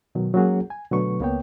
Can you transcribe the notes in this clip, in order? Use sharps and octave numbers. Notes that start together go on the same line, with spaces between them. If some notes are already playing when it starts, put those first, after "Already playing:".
B2 D#3 F#3
F#3 G#3 A#3 C#4 F#4 G#4
G#5
B2 D3 F#3 A3 B4 C#6
C#2 A#3 B3 C#5 G5